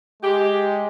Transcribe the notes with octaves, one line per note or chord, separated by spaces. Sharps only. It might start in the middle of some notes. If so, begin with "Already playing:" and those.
G#3 G4